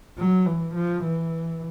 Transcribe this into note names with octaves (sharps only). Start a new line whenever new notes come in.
F#3
E3
F3
E3